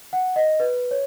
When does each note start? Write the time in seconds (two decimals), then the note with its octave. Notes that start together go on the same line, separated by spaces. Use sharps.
0.13 F#5
0.36 D#5
0.60 B4
0.91 C#5